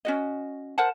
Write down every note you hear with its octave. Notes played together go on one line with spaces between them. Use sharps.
C#4 F#4 D#5
A#4 C5 F#5 A5